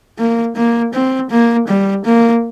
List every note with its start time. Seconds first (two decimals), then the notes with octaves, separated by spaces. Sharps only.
0.19 A#3
0.56 A#3
0.93 C4
1.30 A#3
1.68 G3
2.05 A#3